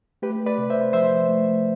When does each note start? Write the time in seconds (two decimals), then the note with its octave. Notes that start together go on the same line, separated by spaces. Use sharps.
0.22 A3 G4 B4
0.46 B4 D5
0.58 C3
0.70 C5 E5
0.93 F3 C5 E5
1.29 A3